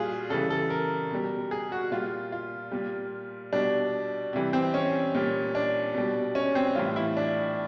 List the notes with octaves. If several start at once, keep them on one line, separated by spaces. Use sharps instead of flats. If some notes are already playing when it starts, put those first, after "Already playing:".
Already playing: A#2 G3 F4 F#4 G#4
C#3 E3 G3 A4
A4
A#4
B2 G3
G#4
F#4
A#2 G3 F4
F4
A#2 G3
B2 G3 D4
C3 E3 G3
C4
C#4
A#2 G3
D4
B2 G3
C#4
C4
A2 E3 G3 F4
E4
D4